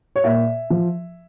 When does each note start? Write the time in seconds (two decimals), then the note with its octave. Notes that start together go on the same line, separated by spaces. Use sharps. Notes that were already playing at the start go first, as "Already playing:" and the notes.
0.16 C#5
0.24 A#2 E5
0.70 F3